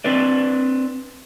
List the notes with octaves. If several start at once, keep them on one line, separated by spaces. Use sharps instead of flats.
C4 D4 B4 D5